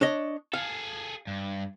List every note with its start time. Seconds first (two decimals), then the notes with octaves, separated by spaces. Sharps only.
0.01 D4 C#5 D#5
0.54 G#4 A4 F5
1.27 G2